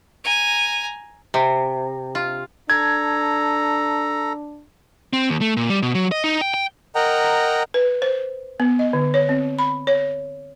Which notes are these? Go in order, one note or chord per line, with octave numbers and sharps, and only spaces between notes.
G#5 A#5
C3
F4
D4 A4 A#5 G#6
C4
D#2
A3
A#2
G3
B2
F#3
D#5
D#4
G5
G5
A#4 D#5 F#5 G5 A#5
B4
C5
B3
D#5
D3
C#5
C4
B5
C#5